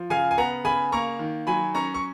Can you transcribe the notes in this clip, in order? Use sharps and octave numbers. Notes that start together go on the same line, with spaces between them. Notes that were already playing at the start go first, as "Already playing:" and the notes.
Already playing: F3
C#3 F5 G#5
G#5
B3 F#5 A#5
C#3 G#5 B5
A#3 A#5 C#6
D#3
F#3 G#5 B5
C#4 A#5 C#6
C#6